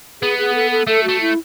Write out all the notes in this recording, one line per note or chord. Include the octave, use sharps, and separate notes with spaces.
B3 G#4
G#4
A4
A4
A3 A4
A3 F#4
E4